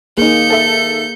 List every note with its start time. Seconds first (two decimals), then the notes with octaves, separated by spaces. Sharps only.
0.18 D#3 A#3 D#4 G#4 G6 C#7
0.50 A4 E5